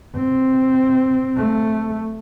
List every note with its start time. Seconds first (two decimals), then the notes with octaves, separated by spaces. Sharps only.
0.16 C4
1.37 A3